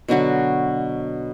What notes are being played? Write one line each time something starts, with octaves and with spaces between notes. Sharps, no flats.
B2 D3 F#3 F#4